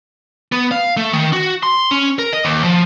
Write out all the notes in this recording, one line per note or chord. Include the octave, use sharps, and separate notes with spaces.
B3
F5
A3
D#3
F#4
C6
C#4
A#4
D#5
D#2
F3